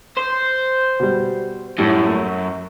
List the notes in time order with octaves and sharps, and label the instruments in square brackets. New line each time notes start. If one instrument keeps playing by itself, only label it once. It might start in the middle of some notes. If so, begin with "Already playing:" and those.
[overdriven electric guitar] C5
[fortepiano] B2 G3
[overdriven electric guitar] F#2 [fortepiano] A2 G3
[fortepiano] A3